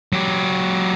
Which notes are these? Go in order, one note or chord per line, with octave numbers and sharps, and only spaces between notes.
F#3 G4